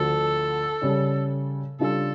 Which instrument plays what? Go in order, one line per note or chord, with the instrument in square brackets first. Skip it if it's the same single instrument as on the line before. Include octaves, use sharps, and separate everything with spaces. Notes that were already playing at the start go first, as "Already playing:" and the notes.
Already playing: [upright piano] D2 D3 F3 [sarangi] A4
[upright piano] C#3 G3 C#4
[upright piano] C#3 G3 D4 F4 [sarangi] A4